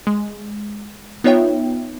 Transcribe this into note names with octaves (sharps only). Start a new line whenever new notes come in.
G#3
B3 D#4 F4 C#5 E5 G5